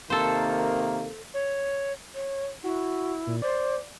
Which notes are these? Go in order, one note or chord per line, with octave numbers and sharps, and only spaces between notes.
C3 D#3 A#3 A4 C5
C#5
C#5
E4 F#4
A#2
C5 D5